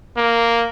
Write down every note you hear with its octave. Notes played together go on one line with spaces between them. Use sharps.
A#3